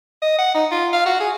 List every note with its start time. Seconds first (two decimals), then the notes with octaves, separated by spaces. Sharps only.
0.23 D#5
0.39 F#5
0.55 D#4
0.72 F4
0.93 F5
1.06 F#4
1.20 G#4